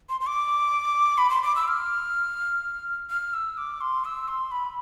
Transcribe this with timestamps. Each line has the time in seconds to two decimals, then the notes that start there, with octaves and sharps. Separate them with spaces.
0.09 C6
0.21 C6
0.27 D6
1.18 B5
1.30 C6
1.43 D6
1.56 E6
1.68 F6
3.10 F6
3.34 E6
3.57 D6
3.81 C6
4.05 E6
4.28 C6
4.51 B5